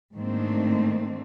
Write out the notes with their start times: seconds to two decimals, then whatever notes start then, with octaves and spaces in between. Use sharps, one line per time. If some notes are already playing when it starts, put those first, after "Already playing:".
0.14 G#2 D#3 A3 A#3 C4 D4